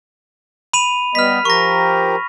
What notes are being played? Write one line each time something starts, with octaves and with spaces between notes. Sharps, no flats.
B5 D#7 F7
G3 B3 D#5 F6 B6
F3 G4 A#4 C#6 A#6